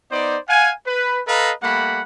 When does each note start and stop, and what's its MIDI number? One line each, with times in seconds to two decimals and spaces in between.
0.11 0.38 59
0.11 0.38 63
0.11 0.38 72
0.11 0.38 74
0.48 0.71 77
0.48 0.71 78
0.48 0.71 80
0.86 1.20 71
1.27 1.52 69
1.27 1.52 71
1.27 1.52 75
1.27 1.52 77
1.27 1.52 82
1.63 2.02 55
1.63 2.02 57
1.63 2.02 58
1.63 2.02 78
1.63 2.02 83